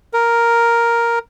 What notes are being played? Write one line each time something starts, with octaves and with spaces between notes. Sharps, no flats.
A#4